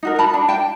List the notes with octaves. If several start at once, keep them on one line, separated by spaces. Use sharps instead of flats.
D#4 F#4 A#4
A5 B5
D4 F#4
G5 A5